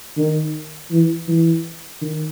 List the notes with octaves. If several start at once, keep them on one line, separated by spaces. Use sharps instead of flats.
D#3
E3
E3
D#3